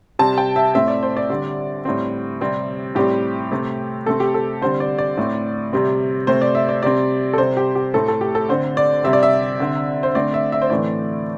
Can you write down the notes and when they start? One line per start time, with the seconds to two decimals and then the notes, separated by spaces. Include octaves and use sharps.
0.19 C3 G3 C4 A5
0.38 G5
0.56 E5
0.75 A2 A3 C4 E5
0.88 D5
1.03 C5
1.17 D5
1.30 D3 G3 C4
1.85 A2 G3 C4
2.41 C3 G3 C4
2.95 A2 G3 C4 G4
3.51 C3 A3 C4
4.06 C3 A3 C4 A4
4.20 G4
4.34 A4
4.62 D3 G3 C4 C5
4.80 D5
4.98 D5
5.18 A2 A3 C4
5.73 C3 G3 C4
6.27 C3 A3 C4 C5
6.42 D5
6.55 E5
6.69 D5
6.83 C3 G3 C4 D5
7.33 A4
7.38 C3 G3 C4 C5
7.57 G4
7.75 G4
7.94 A2 A3 C4 A4
8.08 A4
8.21 G4
8.35 A4
8.49 D3 C4 C5
8.77 D5
9.04 C3 G3 C4 E5
9.13 D5
9.23 E5
9.60 D3 C4
10.03 C5
10.15 D3 A3 C4 D5
10.34 E5
10.52 E5
10.62 C5
10.70 A2 E3 A3 C4 D5